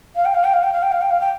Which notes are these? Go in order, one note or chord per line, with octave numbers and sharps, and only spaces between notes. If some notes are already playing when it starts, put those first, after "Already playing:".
F5
G5
F5
G5
F5
G5
F5
G5
F5
G5
F5
G5